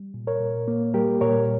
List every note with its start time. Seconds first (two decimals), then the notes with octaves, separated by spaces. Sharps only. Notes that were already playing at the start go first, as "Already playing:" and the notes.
Already playing: G3
0.14 A#2
0.27 A#4 C#5
0.41 A#2
0.68 A#3
0.94 G3 G4 A#4
1.21 A#2 A#4 C#5